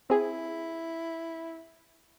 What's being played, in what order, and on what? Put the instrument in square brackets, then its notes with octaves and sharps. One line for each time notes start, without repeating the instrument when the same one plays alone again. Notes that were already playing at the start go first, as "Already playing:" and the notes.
[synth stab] C4 G#4 [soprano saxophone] E4